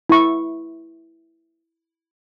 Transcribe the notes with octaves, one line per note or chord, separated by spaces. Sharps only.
E4 C#6